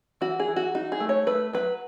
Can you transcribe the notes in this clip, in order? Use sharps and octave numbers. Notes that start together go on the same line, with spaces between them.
E3 F#4
G#4
E3
F#4
D#4 F#4
G#4
A3
C#5
A3 B4
F#3 B4